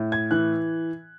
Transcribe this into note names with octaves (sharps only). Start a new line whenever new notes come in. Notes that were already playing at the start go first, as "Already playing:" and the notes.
Already playing: A2
G#6
E3 F#6